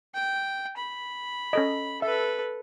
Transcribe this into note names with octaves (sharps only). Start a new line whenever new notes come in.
G5
B5
C#4 A4 D#5
A4 B4 E5